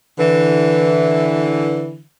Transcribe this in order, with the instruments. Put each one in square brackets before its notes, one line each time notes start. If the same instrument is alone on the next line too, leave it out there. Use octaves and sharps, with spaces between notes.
[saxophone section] D3 E3